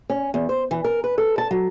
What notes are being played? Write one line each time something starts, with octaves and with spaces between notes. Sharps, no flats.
C#4
E2
C5
E3
A#4
B4
A4
A5
F#3